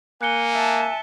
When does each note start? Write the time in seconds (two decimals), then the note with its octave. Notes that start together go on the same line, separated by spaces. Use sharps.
0.22 A#3 G#5 F#6 C#7 G7
0.52 E5 A5